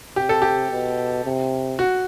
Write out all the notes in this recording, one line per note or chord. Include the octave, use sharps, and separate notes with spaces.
C3 G4
A4
G4
B2
C3
F#4